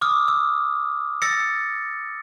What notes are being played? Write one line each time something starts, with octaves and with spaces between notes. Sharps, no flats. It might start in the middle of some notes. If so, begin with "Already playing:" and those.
D6 D#6 F6
E6
E6 A6 A#6 C#7